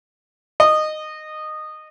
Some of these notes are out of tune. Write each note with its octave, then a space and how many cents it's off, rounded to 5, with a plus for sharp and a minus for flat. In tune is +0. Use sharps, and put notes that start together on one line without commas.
D#5 -15